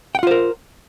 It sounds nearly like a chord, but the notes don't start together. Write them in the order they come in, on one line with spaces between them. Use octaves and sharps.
G5 F#5 F4 C5 A#4